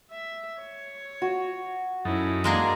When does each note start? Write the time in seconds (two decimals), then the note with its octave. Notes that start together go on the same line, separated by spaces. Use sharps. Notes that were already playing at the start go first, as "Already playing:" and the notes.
0.11 E5
0.61 C#5
1.22 F#4
2.05 F#2 C#4 D#4 E4 A4
2.44 G#3 A#3 D4 G#4 A#4